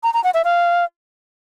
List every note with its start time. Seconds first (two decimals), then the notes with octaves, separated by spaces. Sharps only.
0.03 A#5
0.14 A#5
0.24 F#5
0.34 E5
0.44 F5